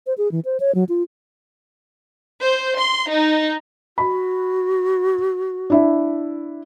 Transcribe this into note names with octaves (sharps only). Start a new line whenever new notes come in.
C5
G#4
E3
C5
C#5
F#3
F4
C5
C6
D#4
F#4 B5
D4 E4 E5